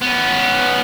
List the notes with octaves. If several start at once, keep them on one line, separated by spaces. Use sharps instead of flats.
B3 C#4